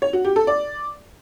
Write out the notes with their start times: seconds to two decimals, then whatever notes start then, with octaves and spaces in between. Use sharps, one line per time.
0.02 C#5
0.13 F#4
0.25 G4
0.36 A4
0.47 D5